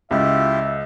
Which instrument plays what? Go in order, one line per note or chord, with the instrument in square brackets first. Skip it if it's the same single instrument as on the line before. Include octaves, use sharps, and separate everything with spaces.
[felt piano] C#2 [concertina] E4 F4 G4 [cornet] E5